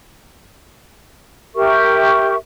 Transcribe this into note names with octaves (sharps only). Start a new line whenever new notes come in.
G4 A#4 E5 C#6